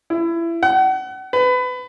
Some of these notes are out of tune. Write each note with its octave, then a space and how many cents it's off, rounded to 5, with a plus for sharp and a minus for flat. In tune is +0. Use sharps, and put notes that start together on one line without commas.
E4 +25
F#5 +35
B4 +25